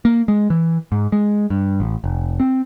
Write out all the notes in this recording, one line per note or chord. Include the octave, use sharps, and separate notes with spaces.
A#3
G#3
E3
G#2
G#3
G2
A1
F1
C4